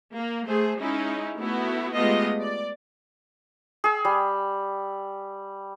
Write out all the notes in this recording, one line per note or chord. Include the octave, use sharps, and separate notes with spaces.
A#3
A3 G#4 C5
G#3 C#4 D#4 E4
A3 B3 E4 F#4
G#3 A3 B3 F4 G4 D#5
D5
G#4 E6
G3